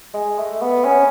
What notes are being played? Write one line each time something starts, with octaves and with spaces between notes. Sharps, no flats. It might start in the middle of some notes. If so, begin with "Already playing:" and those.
G#3
A3
B3
C#4